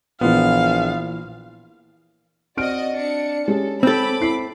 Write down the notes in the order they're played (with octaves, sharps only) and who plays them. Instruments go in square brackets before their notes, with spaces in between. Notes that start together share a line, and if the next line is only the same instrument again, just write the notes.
[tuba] A#1 [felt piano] A#2 E3 [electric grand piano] B3 F4 [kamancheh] F5
[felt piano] C4 F6 D7 [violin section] F#4 D5 D#5
[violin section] D4 C#7
[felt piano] G#3 C#4 G4 [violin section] A4
[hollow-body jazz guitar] C4 A4 [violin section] B5 D6
[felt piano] E4 C7